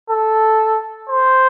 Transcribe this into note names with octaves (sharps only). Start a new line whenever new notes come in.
A4
C5